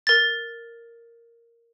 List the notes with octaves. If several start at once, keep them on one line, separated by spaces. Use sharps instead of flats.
A#4 A6